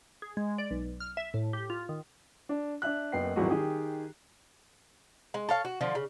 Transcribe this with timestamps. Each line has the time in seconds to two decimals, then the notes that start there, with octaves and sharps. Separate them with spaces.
0.22 G#4
0.37 G#3
0.58 D5
0.71 B1
1.00 F6
1.17 E5
1.34 A2
1.53 G4
1.70 F4
1.89 D#3
2.49 D4
2.82 D4 E5 F#6
3.12 F#1 F#2 B3 G5 C7
3.36 D#1 G#1 E3 F#3 G#3 F#4
3.50 D#3 G4 G#4
5.34 G#3
5.49 A4 C#5 F5
5.65 F#4
5.81 D3 F3 F4
5.95 C#3